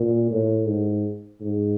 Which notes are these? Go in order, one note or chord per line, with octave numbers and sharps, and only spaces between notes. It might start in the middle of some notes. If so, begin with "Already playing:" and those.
Already playing: A#2
A2
G#2
G#2